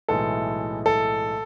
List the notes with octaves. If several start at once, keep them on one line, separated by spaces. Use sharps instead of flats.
B1 A2 E3 G#3 A4
A4